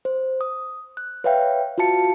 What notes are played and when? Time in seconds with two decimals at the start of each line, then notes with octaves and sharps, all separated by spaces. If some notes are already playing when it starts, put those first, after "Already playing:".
0.05 C5
0.41 D#6
0.97 F#6
1.24 B4 C#5 E5 F5 G5
1.78 F4 F#4 F5 A5 C#7